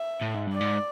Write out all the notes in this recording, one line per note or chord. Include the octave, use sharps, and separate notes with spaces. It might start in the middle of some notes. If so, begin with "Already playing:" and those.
Already playing: E5
A2
G#2
G2
D5
G#2